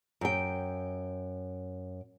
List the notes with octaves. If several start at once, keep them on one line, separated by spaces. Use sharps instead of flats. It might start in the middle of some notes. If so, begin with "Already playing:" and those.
F#2 G5